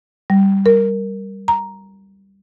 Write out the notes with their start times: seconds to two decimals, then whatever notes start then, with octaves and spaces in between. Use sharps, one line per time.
0.30 G3
0.66 A#4
1.48 A#5